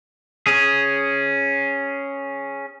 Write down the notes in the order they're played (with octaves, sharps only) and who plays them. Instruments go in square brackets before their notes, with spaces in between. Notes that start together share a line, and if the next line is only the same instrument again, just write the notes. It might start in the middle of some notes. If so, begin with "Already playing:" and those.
[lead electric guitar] C#4 G#4